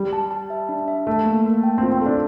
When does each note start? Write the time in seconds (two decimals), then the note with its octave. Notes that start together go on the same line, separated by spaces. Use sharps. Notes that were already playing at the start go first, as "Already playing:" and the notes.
Already playing: G3
0.13 A5
0.31 A5
0.50 E5
0.69 D4
0.88 E5
1.07 A3 A4
1.26 A#3
1.45 A#3
1.63 G5
1.78 C4
1.83 F4
1.92 C4
2.01 D4 A4